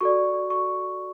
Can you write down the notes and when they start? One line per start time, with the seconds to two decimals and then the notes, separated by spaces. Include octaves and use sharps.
0.01 F#4 A4 D5 C#6
0.50 C#6